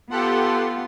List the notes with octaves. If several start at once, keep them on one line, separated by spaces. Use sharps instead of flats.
B3 F4 G4 A4 F#5 C6